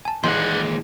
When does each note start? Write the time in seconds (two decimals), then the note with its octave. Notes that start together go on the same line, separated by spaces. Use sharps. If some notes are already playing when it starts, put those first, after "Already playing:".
0.05 G#5 A5
0.24 D#2 A#2 D#3 E3 G#3 F#5 C6